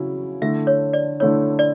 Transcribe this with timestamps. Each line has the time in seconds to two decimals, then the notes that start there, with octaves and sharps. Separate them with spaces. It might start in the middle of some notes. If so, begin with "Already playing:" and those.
Already playing: C#3 F#3 C#4 E4
0.42 D3 A3 E4 E5
0.67 C#5
0.93 D5
1.20 D3 A3 E4 C#5
1.59 D5